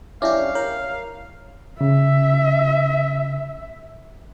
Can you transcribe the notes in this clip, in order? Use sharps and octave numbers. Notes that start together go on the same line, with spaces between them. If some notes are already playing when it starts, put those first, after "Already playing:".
C#4 D4 E4 G4 E5 F5 D6
A#4 C#5
C#3 E5